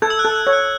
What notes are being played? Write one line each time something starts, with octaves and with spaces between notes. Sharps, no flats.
A4 G#6
E6
F#6
A4
F#6
C#5
F#6